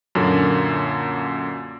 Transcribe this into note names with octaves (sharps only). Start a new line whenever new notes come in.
F#2 A#2 D3 A#3